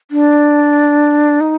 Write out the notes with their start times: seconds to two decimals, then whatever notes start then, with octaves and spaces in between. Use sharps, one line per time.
0.11 D4
1.41 D#4